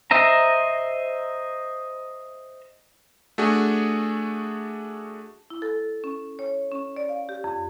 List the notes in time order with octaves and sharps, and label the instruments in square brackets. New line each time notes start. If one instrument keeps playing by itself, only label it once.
[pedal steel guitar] C5 D#5 E5 A#5
[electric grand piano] A3 D4 F#4 G#4
[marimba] E4
A4
C#4
C#5
C#4
D5
F5
G4
F2